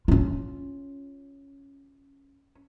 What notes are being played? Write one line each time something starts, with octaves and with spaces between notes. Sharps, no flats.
C#4 F4